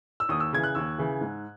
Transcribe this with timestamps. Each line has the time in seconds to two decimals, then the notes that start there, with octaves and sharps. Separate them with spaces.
0.20 E6
0.29 D#2 D#6
0.40 E6
0.53 C#3 E3 G#6
0.64 F#6
0.75 D#2 E6
0.98 C#3 E3
1.21 G#2